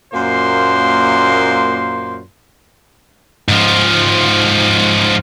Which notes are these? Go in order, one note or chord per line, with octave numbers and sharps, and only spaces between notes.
F#2 A#2 A#3 C5 C6
G#2 F3